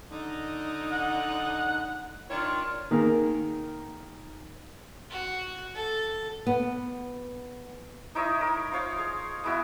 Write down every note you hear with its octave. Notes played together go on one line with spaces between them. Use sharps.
D3 D#4
F#5
D#3 D4 F4 C#5
D#3 A#3 G#4 A#4
F#4
A4
B3
D#4 E4 C#5 D#5
A#4 D#6
F4 C5 C#5 F5
G#4
G#3 B3 E4 F#4